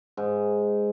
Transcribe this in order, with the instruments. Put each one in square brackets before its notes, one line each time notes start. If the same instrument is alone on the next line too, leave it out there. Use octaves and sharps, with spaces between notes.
[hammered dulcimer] G#2